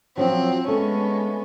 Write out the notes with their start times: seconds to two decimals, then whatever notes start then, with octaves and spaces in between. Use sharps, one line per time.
0.17 F3 F#3 C4
0.68 G#3 A3 B3 C#4